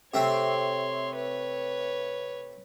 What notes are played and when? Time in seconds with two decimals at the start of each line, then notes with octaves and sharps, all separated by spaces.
0.14 C3 A3 C4 C#5 C6
1.15 B4 C#5